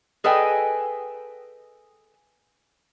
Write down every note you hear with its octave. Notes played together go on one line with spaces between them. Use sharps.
G#4 A4 B4 D#5 G5 G#5